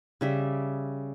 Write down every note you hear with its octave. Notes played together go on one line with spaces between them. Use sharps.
C#3 G3 E5